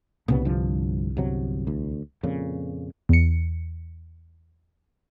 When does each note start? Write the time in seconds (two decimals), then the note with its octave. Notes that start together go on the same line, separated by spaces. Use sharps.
0.28 C2 A#2 C#3 B3
0.45 G2 D3 F3
1.17 G1 C3 F#3
1.67 D2
2.23 F2 A#2 C#3
3.09 E2 C#7